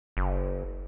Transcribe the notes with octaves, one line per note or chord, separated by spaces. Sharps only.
F#1